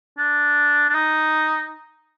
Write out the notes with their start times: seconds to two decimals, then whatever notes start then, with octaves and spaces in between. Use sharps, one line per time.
0.18 D4
0.89 D4
0.94 D#4